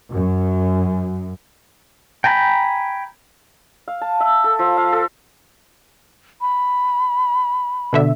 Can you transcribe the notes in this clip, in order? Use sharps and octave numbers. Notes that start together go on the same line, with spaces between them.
F#2
G5 G#5 A#5 B5
F5
A5
E5
A4
F3
F5
A4
B5
B2 D3 E5